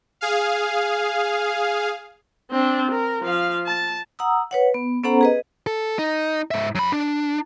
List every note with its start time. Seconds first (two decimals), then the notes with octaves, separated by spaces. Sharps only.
0.21 G#4 F5
2.51 C4 D4
2.91 A#4
3.22 F3 F5
3.67 A5
4.19 F#5 A#5 D#6 E6
4.51 B4 C#5 F#5
4.74 B3
5.03 B3 C#4 A4 C5 F#5 A#5
5.21 G#4 B4 D#5
5.67 A4
5.99 D#4
6.51 G#2 E5
6.75 F#2 B5
6.92 D4